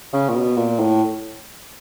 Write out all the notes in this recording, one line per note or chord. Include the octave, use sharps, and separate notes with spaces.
C#3
A#2
B2
A#2
A2